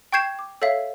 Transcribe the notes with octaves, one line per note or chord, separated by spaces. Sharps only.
G5 C#6 G6 G#6 C7 E7
D6
A4 C#5 E5 F5